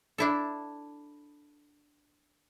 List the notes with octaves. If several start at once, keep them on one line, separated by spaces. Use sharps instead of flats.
D4 E4 A4